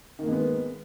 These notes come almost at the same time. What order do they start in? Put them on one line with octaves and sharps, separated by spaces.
D#3 A#3 G#3 B3